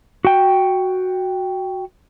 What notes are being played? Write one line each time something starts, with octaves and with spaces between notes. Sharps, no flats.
F#4 G5